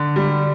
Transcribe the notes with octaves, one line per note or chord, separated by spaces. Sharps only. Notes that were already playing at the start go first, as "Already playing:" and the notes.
Already playing: D3
G3